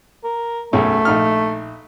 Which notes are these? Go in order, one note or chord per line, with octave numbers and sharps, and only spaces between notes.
A#4
B1 F#2 A3 G#4
A#1 D#4 F6